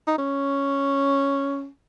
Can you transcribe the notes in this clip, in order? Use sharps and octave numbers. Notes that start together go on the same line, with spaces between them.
D#4
C#4